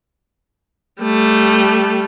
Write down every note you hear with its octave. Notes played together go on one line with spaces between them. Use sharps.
G3 A3